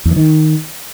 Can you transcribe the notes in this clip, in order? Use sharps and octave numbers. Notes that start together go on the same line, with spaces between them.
E2
E3
D#3